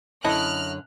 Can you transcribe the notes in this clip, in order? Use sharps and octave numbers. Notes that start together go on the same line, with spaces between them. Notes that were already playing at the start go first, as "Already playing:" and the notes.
F#2 D3 E4 A4 C#5 D#5 F6 F#6